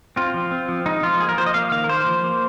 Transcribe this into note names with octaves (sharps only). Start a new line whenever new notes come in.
C4 F4
F3
C4
F3
G#3 D#4
F3 F4
A#3 G#4
A#4
F3 C5
D#5
A#3 F5
D#3 F5
A#4
A#3 C5
F3
A#3